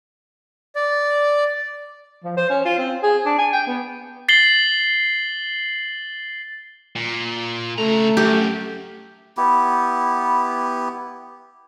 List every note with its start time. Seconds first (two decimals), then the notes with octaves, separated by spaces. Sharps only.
0.75 D5
2.24 F3
2.37 C5
2.50 C#4
2.65 F4
2.78 C4
3.03 G#4
3.26 D4
3.38 G#5
3.53 G5
3.67 B3
4.29 A6 C7 F#7 G7
6.96 A#2
7.78 C#3 A3 A#5
8.17 F#2 G4
9.37 B3 E4 G4